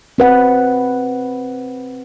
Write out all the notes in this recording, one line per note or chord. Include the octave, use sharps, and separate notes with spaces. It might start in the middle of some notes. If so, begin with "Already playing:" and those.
C4 B4 F#5